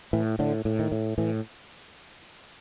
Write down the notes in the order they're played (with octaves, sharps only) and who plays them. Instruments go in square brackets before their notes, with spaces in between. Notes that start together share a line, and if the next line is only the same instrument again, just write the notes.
[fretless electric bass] A2 E3
A2 D3
A2
D#3
A2
A2 E3